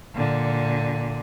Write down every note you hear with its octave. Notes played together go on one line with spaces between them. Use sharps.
A#2 D3